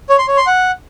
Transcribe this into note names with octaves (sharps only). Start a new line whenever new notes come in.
C#5
C6
C#5
C6
F#5